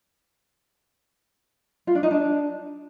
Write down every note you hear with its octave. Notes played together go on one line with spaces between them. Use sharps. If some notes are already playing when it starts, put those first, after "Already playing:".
F4
D4
D#4
D4